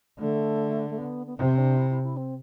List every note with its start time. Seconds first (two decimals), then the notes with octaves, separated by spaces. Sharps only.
0.19 D3 A3
0.90 A3
0.98 B3
1.26 B3
1.37 C3 C4
1.58 D4
1.77 E4
1.90 E4
2.03 E4
2.16 C4